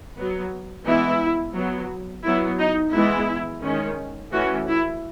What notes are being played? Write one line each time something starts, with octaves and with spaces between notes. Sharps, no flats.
F#3 B3
E3 G#3 B3 E4
F#3 B3
F#3 B3 E4
D#4
E3 G#3 B3 E4
D#3 G#3 C#4
E3 A3 C#4 F#4
E4